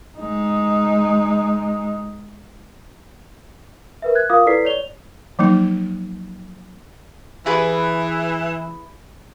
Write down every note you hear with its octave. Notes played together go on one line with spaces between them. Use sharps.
G#3 D#4
A#4 B4 E5
F#6 G#6
F4 A#4 F5 D6 D#6
E4 A4 B4 D5 B6 C7
C#5 D5 F7 G7
F3 F#3 A#3 D#4
E3 E4 G#4 B4